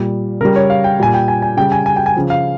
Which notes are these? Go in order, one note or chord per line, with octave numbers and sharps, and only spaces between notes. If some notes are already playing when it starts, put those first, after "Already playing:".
Already playing: A#2 G3
C#3 G3 A#4
C#5
F5
G5
A#2 G3 G#5
G5
G#5
G#5
C#3 G3 G5
G#5
G#5
G5
G#5
C#3 F3
F5